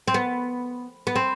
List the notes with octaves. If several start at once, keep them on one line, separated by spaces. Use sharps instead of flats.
C4
B3
B3
C4